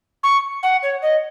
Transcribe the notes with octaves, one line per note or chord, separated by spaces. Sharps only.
C#6
F#5
C#5
D#5